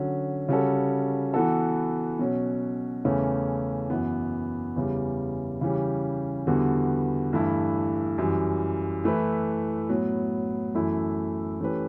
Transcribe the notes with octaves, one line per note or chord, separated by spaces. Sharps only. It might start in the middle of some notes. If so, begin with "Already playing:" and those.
Already playing: D3 F#3 C#4 F#4
C#3 G3 C#4 F#4 A4
E3 B3 F#4 A4
B2 F#3 C#4
E2 C#3 E3 A3 C#4
F#2 E3 B3
E2 C#3 G3
C#3 E3 G3 C#4 G4
E2 D3 G3 B3 F#4
G2 E3 A3 E4
F#2 E3 G3
E3 A3 E4 B4
A2 F#3 B3
F#2 E3 A3 E4
E3 A3 C#4 G4 B4